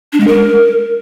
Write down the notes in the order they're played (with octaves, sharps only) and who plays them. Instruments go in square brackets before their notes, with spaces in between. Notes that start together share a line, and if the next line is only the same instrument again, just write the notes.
[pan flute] D4
G#3
A#4